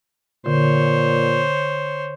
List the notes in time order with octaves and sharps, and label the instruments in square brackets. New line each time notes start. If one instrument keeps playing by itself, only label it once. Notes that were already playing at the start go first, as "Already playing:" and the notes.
[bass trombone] A#2 [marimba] D3 [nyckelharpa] C5 C#5